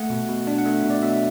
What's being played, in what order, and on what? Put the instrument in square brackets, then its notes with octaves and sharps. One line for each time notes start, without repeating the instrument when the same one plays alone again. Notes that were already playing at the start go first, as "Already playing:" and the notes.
Already playing: [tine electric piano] A3 F#5
B2
B2
D4
F#5
A3 E5
B2
D5
B2 E5